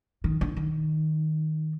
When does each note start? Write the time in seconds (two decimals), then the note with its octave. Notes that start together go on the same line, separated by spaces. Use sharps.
0.24 D#3
0.41 D3
0.57 D#3